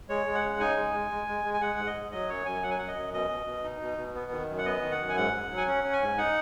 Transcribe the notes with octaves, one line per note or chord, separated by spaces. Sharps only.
G#3 C#5
G#3
F#5
C#3
D#4 G#5
G#3
G#3
G#3
G#3
G#3
G#5
G#3 F#5
G#2
D#5
G#2
F#3 D#5
F#2 C#5
F#2 G#5
F#3 F#5
G#5
F#2 F#5
D#5
F#2
B2 D#5
B2
B2
D#4
B2
B2
B3
D#3
F#2
F#5
B3 D#5
D#3
F#5
F#2
G#5
G#2 F#5
G#2
F#3
G#5
C#4 F#5
C#4
G#5
G#2
D#4 F#5